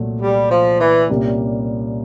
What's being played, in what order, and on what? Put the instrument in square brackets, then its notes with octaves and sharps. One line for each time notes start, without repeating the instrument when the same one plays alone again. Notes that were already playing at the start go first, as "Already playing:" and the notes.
Already playing: [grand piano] C2 A#2 F#3 A3
[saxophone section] G3
F3
E3
[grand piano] C2 A#2 G3 A#3 C#4